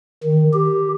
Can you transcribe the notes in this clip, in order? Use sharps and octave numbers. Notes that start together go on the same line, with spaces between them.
D#3
G4